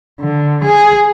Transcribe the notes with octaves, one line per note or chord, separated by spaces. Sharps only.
D3
G#4